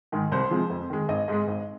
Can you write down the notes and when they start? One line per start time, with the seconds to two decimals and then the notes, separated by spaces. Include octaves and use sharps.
0.12 G#2 D#3 G#3
0.32 C2 C5
0.51 C3 F3 G#3
0.70 F2
0.90 D#3 G#3
1.09 G#1 D#5
1.28 G#2 G#3
1.47 G#1